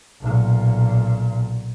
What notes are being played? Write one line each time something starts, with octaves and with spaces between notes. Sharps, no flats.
B1 A#2